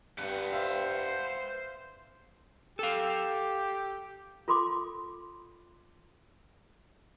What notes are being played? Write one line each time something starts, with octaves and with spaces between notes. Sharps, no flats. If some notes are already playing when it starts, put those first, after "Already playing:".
G2 B4 F#5 G5
C5 E5 F5
G4 A4 F5
F4 A4 B5 C6 D6